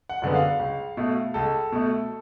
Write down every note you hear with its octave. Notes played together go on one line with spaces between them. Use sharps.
F#5
F#2 D3 G#3 B3
F5
C#2
B2 A3
C#2 A4
B2 A3